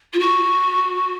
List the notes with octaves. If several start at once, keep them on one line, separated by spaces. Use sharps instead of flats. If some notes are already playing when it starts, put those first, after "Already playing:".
F4
F#4